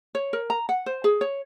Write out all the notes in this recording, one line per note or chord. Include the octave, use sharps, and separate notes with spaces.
C#5
A#4
A#5
F#5
C5
G#4
C#5